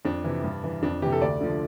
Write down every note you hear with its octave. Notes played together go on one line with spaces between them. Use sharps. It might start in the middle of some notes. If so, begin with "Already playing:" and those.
F2 D4
C3 E3
G2
E3
F2 D4
C3 E3 G4
A4
D2 D5
D3 F3